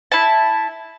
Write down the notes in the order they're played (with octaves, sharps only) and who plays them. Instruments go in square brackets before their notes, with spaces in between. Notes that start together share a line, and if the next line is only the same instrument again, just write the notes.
[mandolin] E4 A5